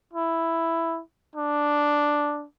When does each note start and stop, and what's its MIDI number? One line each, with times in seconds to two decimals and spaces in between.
0.14 1.01 64
1.35 2.45 62